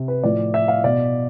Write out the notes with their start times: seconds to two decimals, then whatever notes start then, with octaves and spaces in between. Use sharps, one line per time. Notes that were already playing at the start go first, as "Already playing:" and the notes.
Already playing: C3
0.08 B4
0.23 A2 F3 D5
0.54 E5
0.68 F5
0.84 B2 D5